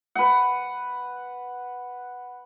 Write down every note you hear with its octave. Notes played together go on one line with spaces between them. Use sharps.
B4 F#5